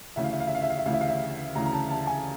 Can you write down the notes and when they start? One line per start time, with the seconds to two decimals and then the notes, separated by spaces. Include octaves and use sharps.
0.16 D2 C#3 E3 E5
0.24 F5
0.32 E5
0.40 F5
0.47 E5
0.55 F5
0.62 E5
0.70 F5
0.78 E5
0.86 D2 C#3 E3 F5
0.93 E5
1.01 F5
1.09 E5
1.55 D2 C#3 E3 A#5
1.66 A#5
1.73 A5
1.90 A5
2.02 A5
2.07 G#5